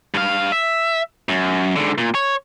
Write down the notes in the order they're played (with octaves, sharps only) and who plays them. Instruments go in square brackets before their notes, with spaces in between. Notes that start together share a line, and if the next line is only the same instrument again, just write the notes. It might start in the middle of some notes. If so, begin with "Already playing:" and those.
[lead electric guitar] G2 F5
E5
F#2
G#2 D3
A#2
C#5